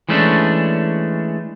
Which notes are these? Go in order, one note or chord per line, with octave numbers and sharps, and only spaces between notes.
E3 G#3 A3 C#4 D4